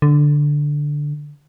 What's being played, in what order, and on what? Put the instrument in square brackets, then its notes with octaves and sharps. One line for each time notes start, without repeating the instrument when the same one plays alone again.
[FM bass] D3